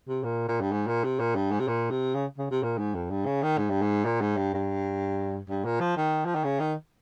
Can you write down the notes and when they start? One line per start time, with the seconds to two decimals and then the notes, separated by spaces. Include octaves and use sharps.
0.08 C3
0.24 A#2
0.48 A#2
0.61 G2
0.72 G#2
0.88 A#2
1.04 C3
1.20 A#2
1.36 G2
1.51 G#2
1.60 C3
1.68 A#2
1.91 C3
2.15 C#3
2.38 C#3
2.51 C3
2.63 A#2
2.78 G#2
2.95 F2
3.10 G2
3.26 C#3
3.43 D#3
3.58 G#2
3.70 G2
3.82 G#2
4.05 A#2
4.21 G#2
4.37 G2
4.54 G2
5.49 G2
5.65 A#2
5.80 F3
5.96 D#3
6.26 F3
6.35 D#3
6.44 C#3
6.60 D#3